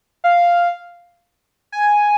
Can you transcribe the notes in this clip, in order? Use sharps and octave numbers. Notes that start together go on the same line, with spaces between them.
F5
G#5